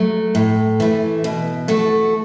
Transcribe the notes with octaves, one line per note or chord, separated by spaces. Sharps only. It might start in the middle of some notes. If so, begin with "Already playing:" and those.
Already playing: F#3 A3
A2
E3 A3
B2
A3 F#4 A4